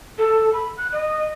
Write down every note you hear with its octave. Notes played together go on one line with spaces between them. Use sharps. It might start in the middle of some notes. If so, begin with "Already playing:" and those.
A4
B5
F#6
D#5